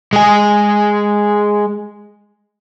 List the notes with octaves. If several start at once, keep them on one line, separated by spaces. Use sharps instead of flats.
G#3 G#4